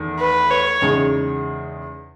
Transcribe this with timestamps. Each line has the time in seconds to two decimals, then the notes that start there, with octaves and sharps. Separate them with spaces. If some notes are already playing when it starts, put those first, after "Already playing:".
Already playing: E2 D#3 A3
0.19 B4
0.50 C#5
0.82 E2 C#3 G#3 D#4